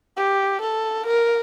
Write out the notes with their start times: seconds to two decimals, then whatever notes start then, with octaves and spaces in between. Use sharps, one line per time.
0.17 G4
0.62 A4
1.06 A#4